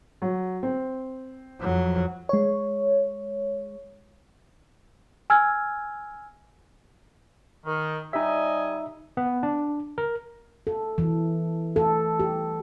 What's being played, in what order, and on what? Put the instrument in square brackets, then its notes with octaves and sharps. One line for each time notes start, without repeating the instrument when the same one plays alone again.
[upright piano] F#3
C4
[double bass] F2 F#3
[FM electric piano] G#3 C#5
[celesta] G#5 E6 F6 G#6
[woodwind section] D#3
[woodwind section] G3 D#5 G#5 [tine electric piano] D#4 E5
[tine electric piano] B3
D4
A#4
[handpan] A4
E3
A4
G4